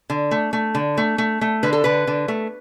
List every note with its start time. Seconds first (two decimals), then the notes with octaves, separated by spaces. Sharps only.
0.10 D3
0.31 A3
0.53 A3
0.75 D3
0.98 A3
1.18 A3
1.41 A3
1.63 D3 B4
1.73 A4
1.84 D3 B4
2.07 D3
2.28 A3